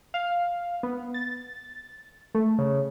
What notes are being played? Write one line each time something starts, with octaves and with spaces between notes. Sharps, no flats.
F5
B3
A6
A3
C#3